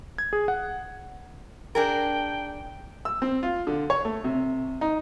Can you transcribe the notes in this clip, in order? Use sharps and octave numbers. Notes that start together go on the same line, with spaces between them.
G#6
G#4
F#5
D4 G#4 A#4 G5
E6
C4
F4
D3
C#5
A3
C3
D#4